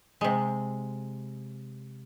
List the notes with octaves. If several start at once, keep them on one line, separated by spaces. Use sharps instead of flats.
C3 G#3